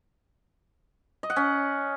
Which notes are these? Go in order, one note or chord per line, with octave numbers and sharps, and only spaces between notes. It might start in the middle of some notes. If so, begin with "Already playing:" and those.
D#5
F#5
C#4